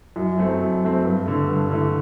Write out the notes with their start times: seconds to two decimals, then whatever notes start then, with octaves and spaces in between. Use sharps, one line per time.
0.16 F#2
0.38 F#3 A3 C4
0.60 F#2
0.82 F#3 A3 C4
1.04 G2
1.26 D3 A3
1.49 G2
1.70 D3 A3